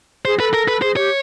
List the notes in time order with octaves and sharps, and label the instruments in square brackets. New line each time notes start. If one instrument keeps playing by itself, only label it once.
[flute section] G#4 [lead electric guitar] C5
[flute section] A4 [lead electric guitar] B4
[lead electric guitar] A#4
B4
[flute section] G#4 [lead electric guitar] C5
[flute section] G4 [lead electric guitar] C#5